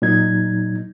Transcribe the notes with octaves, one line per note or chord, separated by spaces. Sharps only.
A#2 F#3 D#4 G#6